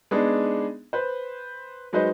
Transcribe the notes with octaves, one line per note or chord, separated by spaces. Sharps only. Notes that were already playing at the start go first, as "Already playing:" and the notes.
G#3 B3 D4 D#4 G#4
B4 C5
F#3 G#3 D#4 B4 C5 D#5